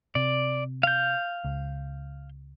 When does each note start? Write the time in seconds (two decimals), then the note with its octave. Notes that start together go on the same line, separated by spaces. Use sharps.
0.15 C3 D5
0.83 F5 G6
1.44 C#2